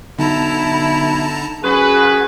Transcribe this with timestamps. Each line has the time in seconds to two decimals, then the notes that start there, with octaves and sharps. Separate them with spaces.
0.19 B1 D3 E4 A5 A#5
1.63 F#2 F#4 G#4 B4